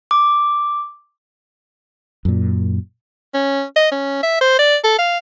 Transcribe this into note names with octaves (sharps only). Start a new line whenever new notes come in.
D6
F#2 A#2
C#4
D#5
C#4
E5
C5
D5
A4
F5